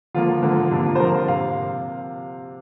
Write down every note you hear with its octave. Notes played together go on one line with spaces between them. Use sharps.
D3 F3 A#3 F4
D3 F3 A#3
C3 F3 A#3 D4
F4
C5
C3 F3 A#3 A#4
C5
C3 F5